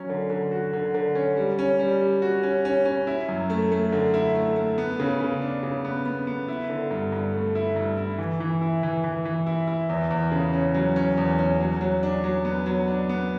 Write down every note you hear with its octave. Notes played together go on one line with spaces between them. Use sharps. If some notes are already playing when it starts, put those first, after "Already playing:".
Already playing: F#3 C#4
D3
D3
F#4
D3
D3
C#4
G3
C#4
G3
G3
F#4
C#4
C#4
C#4
E4
F#2
A3
A3
D3
E4
A3
A3
B3
C#3
C#3
D4
C#3
B3
B3
B3
E4
D3
G2
G2
A3
E4
G2
E4
E3
E3
E4
E3
E3
E3
E4
E4
E2
E2
C#3
C#4
F#3
C#4
E2
C#4
F#3
F#3
D4
F#3
B3
F#3
D4
B3